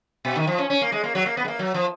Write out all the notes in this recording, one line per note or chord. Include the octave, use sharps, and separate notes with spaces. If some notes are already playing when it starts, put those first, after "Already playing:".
B2
D#3
F3
C#4
C#4
A#3
G#3
A#3
F#3
A#3
B3
G#3
A#3
F#3
F3